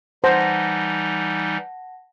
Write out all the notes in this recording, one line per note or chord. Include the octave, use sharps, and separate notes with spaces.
E3 G3 D#4 C5 F#5 A5 A#6